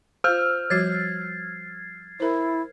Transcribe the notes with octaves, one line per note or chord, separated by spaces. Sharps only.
F4 C5 F5 E6 F6 G6
F3 G3 F#4 G#6 A6 C7
E4 A#4 C5